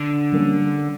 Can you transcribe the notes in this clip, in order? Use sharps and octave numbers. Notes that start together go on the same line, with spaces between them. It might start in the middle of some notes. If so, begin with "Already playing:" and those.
Already playing: D3
G3 A#3 C#4